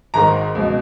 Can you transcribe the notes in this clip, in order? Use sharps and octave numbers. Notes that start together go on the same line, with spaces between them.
G#1 G#2 D#3 A#5
C#2 B2